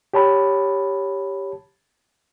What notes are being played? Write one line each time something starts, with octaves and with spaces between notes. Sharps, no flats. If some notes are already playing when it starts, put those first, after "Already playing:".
G4 C#5 A5 B5